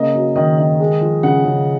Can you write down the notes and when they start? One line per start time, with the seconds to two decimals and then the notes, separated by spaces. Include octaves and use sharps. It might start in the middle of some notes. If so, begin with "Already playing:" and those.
Already playing: C#3 A#3 D#5
0.14 F#3
0.36 D#3 D#5
0.58 D#3
0.80 G#3
1.01 F3
1.23 C#3 F#5
1.45 C#3